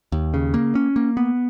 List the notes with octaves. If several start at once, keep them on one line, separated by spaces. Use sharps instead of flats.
D#2
C#3
A#3
C#4
A#3
B3